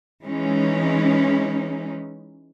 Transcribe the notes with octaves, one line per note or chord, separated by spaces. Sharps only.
E3 G#3 C#4 D#4